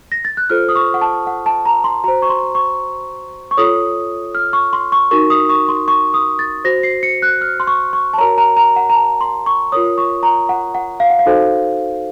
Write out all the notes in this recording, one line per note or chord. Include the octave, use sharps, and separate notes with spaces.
A#6
A6
F#6
F4 A4 C5 F6
D#6
C#6
F#5
A5
F#5
A5
A#5
C6
F#4 C5 A#5
C#6
C6
C#6
C#6
F4 A4 C#5 D#6
F6
C#6
C6
C#6
D#4 F#4 A#4 C#6
D#6
C#6
C6
C#6
D#6
A6
F#4 C5 A#6
C7
C#7
F#6
F6
C6
C#6
C#6
A5
F#4 A#4 C#5 A#5
A#5
A#5
F#5
A#5
A5
C6
C#6
F4 A#4 C#5 D#6
C#6
A#5
F#5
F#5
F5
F#5
F5
D#4 F#4 A4 C5